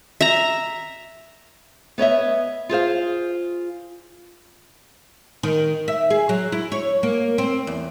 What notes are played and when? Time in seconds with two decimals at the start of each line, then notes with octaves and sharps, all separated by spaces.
0.21 E5 A#5
1.98 B3 C#5 D#5 E5
2.69 F4 G#4 C5 F5
5.43 D#3
5.88 E5
6.10 G#4
6.29 F#3
6.52 E4
6.72 C#5
7.03 A#3
7.38 C4
7.67 E2